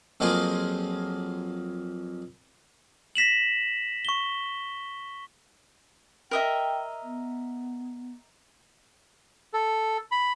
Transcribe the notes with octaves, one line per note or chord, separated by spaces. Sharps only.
F2 F3 F#3 A#3 F4 G#4
A#6 B6 E7 F#7
C#6 G7
A#4 D#5 E5 G5
B3
A4
B5